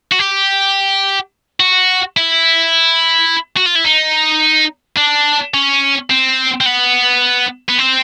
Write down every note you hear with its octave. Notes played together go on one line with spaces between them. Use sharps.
F#4
G4
F#4
E4
F#4
F4
E4
D#4
D4
C#4
C4
C4
B3
B3
C4